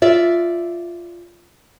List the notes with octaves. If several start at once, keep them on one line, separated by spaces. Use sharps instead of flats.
F4 D5 E5